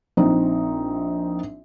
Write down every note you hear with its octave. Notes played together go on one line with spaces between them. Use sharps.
A#1 C4 D#4